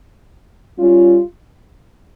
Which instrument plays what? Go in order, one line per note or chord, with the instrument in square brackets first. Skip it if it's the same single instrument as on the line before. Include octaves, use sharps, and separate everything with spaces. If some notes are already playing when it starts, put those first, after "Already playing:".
[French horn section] G3 C#4 F4